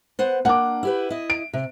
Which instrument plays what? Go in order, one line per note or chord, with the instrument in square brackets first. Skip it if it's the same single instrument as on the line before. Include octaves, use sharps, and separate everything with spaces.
[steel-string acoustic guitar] B3 C5 F#5
[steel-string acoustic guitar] A#3 D4 [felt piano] F#5 D6
[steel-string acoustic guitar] E4 G4 B4
E4 D#5
[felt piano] D7
[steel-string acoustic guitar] C3